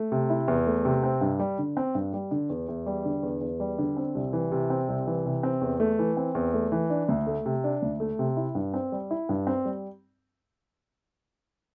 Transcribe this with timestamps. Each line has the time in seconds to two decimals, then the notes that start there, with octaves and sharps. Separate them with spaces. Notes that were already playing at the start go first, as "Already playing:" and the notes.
Already playing: A3
0.12 C3
0.30 E4
0.48 E2
0.67 A3
0.85 C3
1.03 C4
1.21 G2
1.39 G3
1.58 D3
1.77 C4
1.95 G2
2.13 G3
2.31 D3
2.49 E2
2.68 E2
2.86 G3
3.05 D3
3.23 E2
3.41 E2
3.60 G3
3.78 D3
3.97 C4
4.15 C2
4.33 E3
4.52 C3
4.70 C4
4.88 C2
5.07 E3
5.25 C3
5.43 C4
5.61 E2
5.80 A3
5.99 E3
6.17 C4
6.35 E2
6.54 A3
6.72 E3
6.90 D4
7.09 D2
7.27 A3
7.46 C3
7.64 D4
7.82 D2
8.00 A3
8.19 C3
8.37 E4
8.55 G2
8.74 C4
8.92 G3
9.11 E4
9.29 G2
9.47 C4
9.65 G3